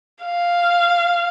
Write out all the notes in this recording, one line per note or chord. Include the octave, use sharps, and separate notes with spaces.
F5